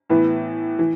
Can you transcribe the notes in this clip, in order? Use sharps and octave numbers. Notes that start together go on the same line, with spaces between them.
A2 E3 B3
E3